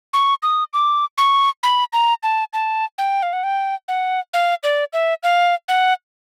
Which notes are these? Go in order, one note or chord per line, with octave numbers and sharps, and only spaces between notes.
C#6
D#6
D6
C#6
B5
A#5
A5
A5
G5
F5
F#5
G5
F#5
F5
D5
E5
F5
F#5